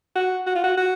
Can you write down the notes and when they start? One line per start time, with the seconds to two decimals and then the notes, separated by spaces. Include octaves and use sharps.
0.15 F#4
0.46 F#4
0.55 F4
0.64 F#4
0.77 F#4